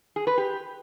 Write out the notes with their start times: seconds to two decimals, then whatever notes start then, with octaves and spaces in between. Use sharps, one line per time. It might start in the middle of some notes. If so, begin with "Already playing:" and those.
0.16 G#4
0.27 B4
0.38 G4